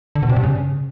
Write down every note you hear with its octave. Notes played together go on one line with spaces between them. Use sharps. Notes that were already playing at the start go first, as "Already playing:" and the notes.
D3
B2
C3
G2
C#3